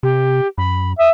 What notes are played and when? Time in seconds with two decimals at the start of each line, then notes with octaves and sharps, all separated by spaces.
0.03 C3 G4
0.58 F#2 B5
0.99 E5 D#6